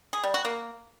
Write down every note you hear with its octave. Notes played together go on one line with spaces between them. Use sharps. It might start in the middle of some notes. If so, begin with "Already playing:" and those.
G#4
G3
F#4
A#3